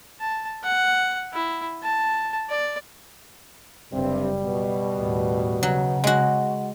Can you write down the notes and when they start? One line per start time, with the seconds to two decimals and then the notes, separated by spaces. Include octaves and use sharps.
0.21 A5
0.63 F#5
1.33 E4
1.83 A5
2.49 D5
3.93 F#1 G2 C3 G3 C4
4.43 B2
4.96 D#2 A2
5.63 C#3 F#3
6.04 G#3 F#4